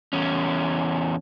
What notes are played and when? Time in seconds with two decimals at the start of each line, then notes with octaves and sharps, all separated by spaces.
0.13 E2 C#4